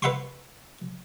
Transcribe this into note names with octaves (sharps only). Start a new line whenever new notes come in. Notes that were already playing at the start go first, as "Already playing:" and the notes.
B4 E5 F#5 C6 C#6